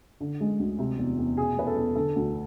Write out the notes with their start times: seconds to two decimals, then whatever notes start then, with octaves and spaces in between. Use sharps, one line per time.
0.20 D3
0.41 G#3
0.59 D2
0.78 C3
0.98 E2
1.19 E2
1.37 B2 G#4
1.57 E2 B4
1.67 A4
1.76 E2
1.95 D3 A4
2.16 D2